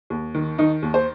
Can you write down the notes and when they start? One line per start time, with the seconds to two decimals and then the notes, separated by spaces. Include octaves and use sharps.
0.10 D#2
0.35 D#3
0.58 D#3 D#4
0.83 D#2
0.94 C5